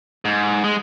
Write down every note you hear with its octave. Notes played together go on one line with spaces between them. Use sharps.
G#2
G#3